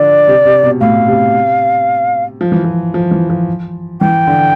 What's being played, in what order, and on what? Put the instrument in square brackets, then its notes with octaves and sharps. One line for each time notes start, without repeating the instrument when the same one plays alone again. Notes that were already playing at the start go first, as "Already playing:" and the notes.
Already playing: [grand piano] D3 F3 [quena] D5
[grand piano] C3
C3
B2
[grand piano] A2 [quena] F5
[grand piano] C3
F3
E3
F3
F3
E3
F3
[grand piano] E3 [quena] G5
[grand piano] D3